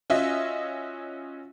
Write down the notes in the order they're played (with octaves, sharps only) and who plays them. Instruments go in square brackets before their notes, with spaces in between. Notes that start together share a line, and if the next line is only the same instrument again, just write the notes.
[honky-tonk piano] C#4 F4 F#4 D#5 E5